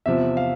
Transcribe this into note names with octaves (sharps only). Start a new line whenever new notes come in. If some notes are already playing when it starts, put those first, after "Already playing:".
E2 C3 F3 E5
F5